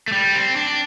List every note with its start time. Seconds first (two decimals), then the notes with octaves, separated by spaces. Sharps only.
0.08 A3
0.12 G3
0.35 C4
0.56 D4